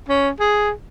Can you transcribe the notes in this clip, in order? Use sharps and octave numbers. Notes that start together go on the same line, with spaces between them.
C#4
G#4